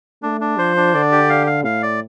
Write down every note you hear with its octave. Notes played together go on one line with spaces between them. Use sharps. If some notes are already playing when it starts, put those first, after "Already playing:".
A3 D4
D4
F3 C5
D4
D3 D5
G4
F5
F5
A2 F5
D5